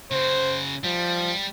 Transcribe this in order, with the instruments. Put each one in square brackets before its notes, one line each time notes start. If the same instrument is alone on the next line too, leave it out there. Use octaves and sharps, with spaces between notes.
[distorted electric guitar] C#3 F#4 [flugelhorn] C5
[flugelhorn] F3 [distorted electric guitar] G3